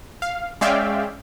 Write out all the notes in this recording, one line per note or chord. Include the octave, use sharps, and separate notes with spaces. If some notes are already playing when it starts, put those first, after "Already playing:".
F5
G#3 C#4 D5 E5 F5 G5